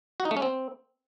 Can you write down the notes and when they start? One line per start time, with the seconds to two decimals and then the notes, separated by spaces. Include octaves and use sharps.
0.20 F#4
0.25 D#4
0.31 A3
0.37 C#4
0.42 C4